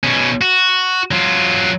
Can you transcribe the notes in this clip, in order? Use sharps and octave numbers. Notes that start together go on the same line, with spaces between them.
B2 C#4
F#4
F#3 F4